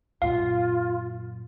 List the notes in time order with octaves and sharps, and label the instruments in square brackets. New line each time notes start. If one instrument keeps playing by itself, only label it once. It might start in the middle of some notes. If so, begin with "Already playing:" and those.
[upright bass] F#2 A#2 [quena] F4 [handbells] F5